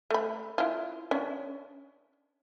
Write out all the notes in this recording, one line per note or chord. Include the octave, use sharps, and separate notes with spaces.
A3 B5
E4 F4
C#4 D4